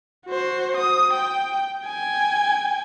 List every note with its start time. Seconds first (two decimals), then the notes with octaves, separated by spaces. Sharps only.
0.27 F#4 C5
0.77 D#6
1.14 G5
1.86 G5 G#5